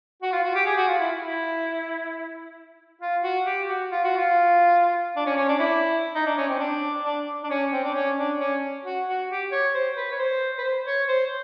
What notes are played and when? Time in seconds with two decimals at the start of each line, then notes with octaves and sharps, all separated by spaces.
0.22 F#4
0.32 F4
0.44 F#4
0.55 G4
0.66 G#4
0.77 F#4
0.88 F4
0.99 E4
1.22 E4
3.01 F4
3.23 F#4
3.46 G4
3.68 F#4
3.91 F4
4.04 F#4
4.17 F4
5.16 D4
5.26 C#4
5.36 C#4
5.48 D4
5.59 E4
6.15 D#4
6.26 D4
6.37 C#4
6.48 C4
6.60 D4
7.04 D4
7.43 D4
7.50 C#4
7.72 C4
7.84 D4
7.95 C#4
8.16 D4
8.39 C#4
8.84 F#4
9.07 F#4
9.30 G4
9.52 C#5
9.74 C5
9.96 B4
10.12 C#5
10.19 C5
10.58 B4
10.64 C5
10.86 C#5
11.08 C5